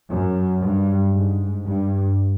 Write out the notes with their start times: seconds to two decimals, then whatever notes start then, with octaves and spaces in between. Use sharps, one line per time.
0.10 F#2
0.62 G2
1.13 G#2
1.65 G2